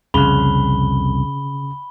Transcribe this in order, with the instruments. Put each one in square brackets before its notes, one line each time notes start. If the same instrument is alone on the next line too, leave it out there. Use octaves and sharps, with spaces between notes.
[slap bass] C2 F2 [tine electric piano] C#3 [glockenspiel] B5 G7